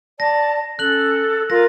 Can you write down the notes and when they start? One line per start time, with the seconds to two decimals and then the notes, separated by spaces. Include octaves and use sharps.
0.20 D5 A5 A#6
0.79 C#4 A4 F#6 F#7
1.50 F4 A#4 A#6